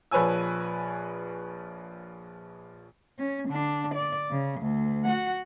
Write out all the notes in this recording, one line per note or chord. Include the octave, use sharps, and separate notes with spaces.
A#1 F3 B4 C#5 G#5 E6
C#4
D3 D4
D5
C#3
D2
F#4 F#5